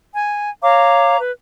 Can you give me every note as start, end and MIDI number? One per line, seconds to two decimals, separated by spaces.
0.14 0.49 80
0.62 1.17 73
0.62 1.17 77
0.62 1.17 82
0.62 1.17 86
1.19 1.32 71